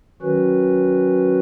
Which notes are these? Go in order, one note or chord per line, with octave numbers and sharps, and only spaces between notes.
D#3 F#3 C#4 F#4 B4